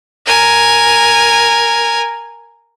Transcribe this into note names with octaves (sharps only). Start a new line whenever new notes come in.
A#4 G#5